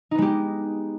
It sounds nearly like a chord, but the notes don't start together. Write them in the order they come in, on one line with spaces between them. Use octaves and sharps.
D#4 B3 G#3 G4